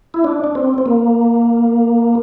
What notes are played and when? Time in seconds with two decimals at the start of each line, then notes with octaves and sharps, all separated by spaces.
0.14 E4
0.24 D4
0.44 D4
0.55 C4
0.78 C4
0.86 A#3